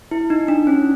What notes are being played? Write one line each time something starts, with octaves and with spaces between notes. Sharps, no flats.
E4
D#4
D4
C#4